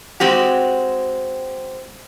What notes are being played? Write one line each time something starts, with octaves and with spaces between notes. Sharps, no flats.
G#3 C4 F#4 G4